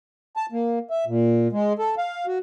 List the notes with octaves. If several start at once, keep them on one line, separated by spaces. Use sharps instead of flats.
A5
A#3
E5
A#2
G#3
A4
F5
F#4